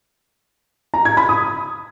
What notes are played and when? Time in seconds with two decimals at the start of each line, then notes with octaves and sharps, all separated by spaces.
0.94 A#5
1.05 G#6
1.17 B5
1.29 D#6